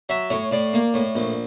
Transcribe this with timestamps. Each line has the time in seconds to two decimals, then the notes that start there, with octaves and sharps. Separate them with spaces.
0.09 F#3 E5
0.30 A2 C#5
0.51 A2 D5
0.73 A#3
0.94 A2
1.15 A#1